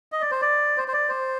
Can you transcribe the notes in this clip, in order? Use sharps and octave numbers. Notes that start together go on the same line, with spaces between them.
D#5
D5
C5
D5
C5
C5
D5
C5